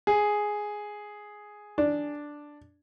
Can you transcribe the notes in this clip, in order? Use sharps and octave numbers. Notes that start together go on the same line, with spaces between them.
G#4
D4